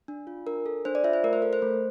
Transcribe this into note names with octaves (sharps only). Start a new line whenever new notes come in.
D4
F4
D4 A#4
A4
D4 C5
D5
F4 E5
C5
A3 A#4
C5
A4 A#4
C5
A3